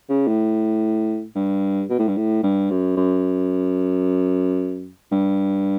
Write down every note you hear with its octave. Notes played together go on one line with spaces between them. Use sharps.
C#3
A2
G2
B2
A2
G2
A2
G2
F#2
F#2
G2